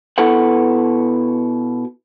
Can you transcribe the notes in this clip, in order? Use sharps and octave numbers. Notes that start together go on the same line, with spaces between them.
B2 E4 A4 B4 F#5